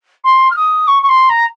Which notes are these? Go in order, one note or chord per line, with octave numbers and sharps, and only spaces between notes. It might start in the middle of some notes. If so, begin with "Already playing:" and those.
C6
F6
D#6
C#6
C#6
C6
A#5